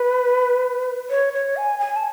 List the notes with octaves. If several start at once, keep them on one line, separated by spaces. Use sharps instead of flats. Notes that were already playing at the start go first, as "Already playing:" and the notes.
Already playing: B4
C#5
C#5
G#5
G#5
A5